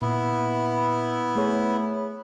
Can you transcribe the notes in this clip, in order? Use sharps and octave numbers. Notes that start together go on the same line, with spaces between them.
A#2 B3 E4
A3 G#4 C#5